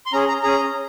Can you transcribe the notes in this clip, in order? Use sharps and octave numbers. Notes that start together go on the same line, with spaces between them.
C6
C#4 G#4 A#5
A#5
C#4 G#4 A#5